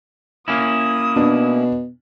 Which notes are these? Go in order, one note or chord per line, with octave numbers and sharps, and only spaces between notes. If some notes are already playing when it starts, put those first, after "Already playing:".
A#3 C#4 E4 D#6
B2 D4